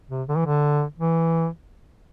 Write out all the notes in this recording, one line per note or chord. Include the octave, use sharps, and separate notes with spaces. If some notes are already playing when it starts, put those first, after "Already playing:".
C3
D3
E3
D3
E3